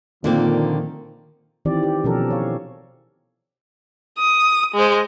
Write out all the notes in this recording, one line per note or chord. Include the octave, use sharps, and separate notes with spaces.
A#2 D3 D#3 F3 A#3 C4
D#3 E3 C4 G4 D5
G4
B2 F3 C#4 G4 A4 A#4
C#5 F5
D#6
G#3 C5